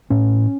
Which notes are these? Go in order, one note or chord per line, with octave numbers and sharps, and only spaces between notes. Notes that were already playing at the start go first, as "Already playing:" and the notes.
A2 C#4